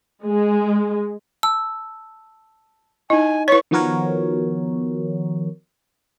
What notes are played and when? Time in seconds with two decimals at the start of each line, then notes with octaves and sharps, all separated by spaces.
0.24 G#3
1.43 A5 E6
3.10 D#4 E4 D#5 G#5
3.48 E4 B4 C#5 C#6 B6
3.71 D#3 F3 B3 F#4 A#4 C#5